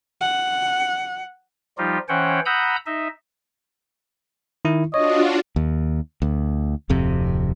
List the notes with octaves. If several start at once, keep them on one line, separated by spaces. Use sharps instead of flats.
F#5
F3 G3 D#4 F4 G4
E3 C#4 C5 C#5 F#5 G5
F#5 A#5 B5 D#6 E6 G6
D#4 D#5 E5
D#3 E4
D4 F4 F#4 C#5 D#5
D#2
D2
D1 F2 C3